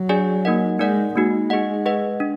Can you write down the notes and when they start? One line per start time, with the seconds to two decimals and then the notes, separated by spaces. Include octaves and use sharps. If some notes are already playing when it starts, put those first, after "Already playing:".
Already playing: F#3
0.09 D4 G#4 D5 G#5
0.45 A#3 D#4 A#4 D#5 F#5
0.79 G#3 D#4 A#4 D5 F#5
1.15 G#3 A#3 D#4 F#4
1.50 D#4 G#4 D#5 F#5
1.86 G#4 B4 D#5 F#5
2.20 D4